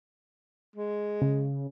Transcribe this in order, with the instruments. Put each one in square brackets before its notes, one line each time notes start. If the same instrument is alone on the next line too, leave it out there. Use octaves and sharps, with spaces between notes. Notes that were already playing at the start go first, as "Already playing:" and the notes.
[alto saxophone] G#3
[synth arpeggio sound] C#3